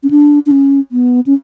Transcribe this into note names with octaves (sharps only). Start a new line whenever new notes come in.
C#4
D4
D4
C#4
B3
C#4